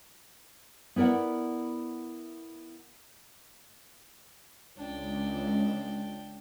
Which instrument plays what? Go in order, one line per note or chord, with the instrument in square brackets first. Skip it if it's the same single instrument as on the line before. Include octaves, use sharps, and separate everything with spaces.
[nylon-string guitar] B3 E4 A#4 D5 F#5
[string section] C#2 [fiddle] D4 G5